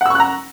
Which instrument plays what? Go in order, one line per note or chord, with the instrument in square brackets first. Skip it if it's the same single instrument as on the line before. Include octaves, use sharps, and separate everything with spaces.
[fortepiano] F#5
E6
C#6
F#6
A#5